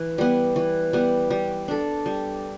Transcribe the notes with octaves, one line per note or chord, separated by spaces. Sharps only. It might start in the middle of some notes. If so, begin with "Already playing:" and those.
Already playing: E3
G3 B3
E3
G3 B3
G3
D4 A4
G3